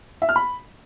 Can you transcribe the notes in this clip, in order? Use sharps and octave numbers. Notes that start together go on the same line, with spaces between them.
E5
F6
B5